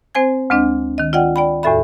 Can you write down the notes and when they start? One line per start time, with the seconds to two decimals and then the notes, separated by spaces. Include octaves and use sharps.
0.15 C4 C5 G#5 G#6
0.50 D2 G#3 C4 D4 D#5
0.98 D#3 D#5
1.13 F4 D5 D#5 F#5 G5
1.36 D5 G5 B5
1.63 E2 A2 F#4 A4 E5 B5